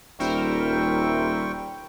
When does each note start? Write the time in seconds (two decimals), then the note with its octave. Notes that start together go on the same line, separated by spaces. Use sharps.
0.20 D#1 G3 A#4 C5 E5 G5 C#6